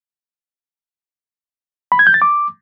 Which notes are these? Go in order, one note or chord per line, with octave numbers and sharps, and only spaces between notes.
B5
G#6
G6
A6
D6